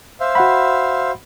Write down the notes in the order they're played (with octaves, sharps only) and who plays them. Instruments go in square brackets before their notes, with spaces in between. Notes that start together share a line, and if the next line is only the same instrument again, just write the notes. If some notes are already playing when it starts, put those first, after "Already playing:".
[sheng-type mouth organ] C5 E5 F5
[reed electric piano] F#4 F#5 B5